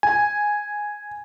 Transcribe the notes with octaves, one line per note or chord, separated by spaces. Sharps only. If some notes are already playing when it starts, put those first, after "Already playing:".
G#5